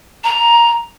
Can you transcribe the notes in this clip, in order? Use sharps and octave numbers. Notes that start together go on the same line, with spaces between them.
A#5